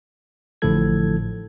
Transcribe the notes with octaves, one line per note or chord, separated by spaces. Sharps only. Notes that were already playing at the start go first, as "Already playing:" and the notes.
A1 A2 D3 F3 A4 G#6